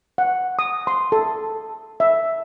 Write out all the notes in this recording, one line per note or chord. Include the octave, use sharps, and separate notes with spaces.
F#5
D#6
C6
A4
E5